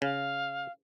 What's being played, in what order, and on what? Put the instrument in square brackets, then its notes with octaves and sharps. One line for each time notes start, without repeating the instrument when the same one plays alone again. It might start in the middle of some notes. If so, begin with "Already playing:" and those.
[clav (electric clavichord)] C#3 [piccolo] F5